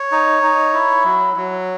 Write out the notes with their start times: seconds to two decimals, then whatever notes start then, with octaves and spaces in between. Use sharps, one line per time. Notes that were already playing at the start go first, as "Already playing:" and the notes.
Already playing: C#5
0.12 D#4
0.43 D#4
0.73 E4
1.04 F#3
1.36 F#3